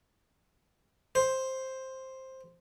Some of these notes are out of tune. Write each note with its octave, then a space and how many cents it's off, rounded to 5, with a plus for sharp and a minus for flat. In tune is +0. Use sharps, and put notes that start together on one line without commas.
C5 +5